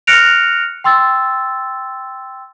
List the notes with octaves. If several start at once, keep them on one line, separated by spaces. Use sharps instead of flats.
F6 F#6 A#6 C#7 D7 F7
G5 C6 E6 A6